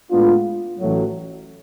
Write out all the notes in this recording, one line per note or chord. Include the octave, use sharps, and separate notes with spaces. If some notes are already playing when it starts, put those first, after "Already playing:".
A2 G#3 B3 D4 F4
A1 A2 F#3